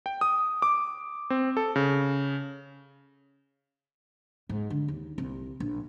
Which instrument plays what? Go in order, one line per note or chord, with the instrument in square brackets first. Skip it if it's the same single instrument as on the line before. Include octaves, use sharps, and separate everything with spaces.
[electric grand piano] G5
D#6
D6
C4
A4
C#3
[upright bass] G#2
D3
D#2
C2
A#1